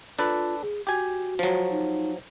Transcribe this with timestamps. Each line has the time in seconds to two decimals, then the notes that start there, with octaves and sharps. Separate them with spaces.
0.19 D4 F4 A4 B4
0.62 G#4
0.87 F#4 G4 G#5
1.39 F3 F#3
1.71 D#4